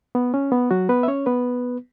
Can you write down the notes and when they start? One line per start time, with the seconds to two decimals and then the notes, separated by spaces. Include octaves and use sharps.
0.15 B3
0.34 C#4
0.52 B3
0.71 F#3 F#4
0.89 B3 B4
1.03 E5
1.08 C#4 C#5
1.26 B3 B4